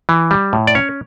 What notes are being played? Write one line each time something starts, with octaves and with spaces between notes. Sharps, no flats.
E3
G3
A2
D5
C#4 C#5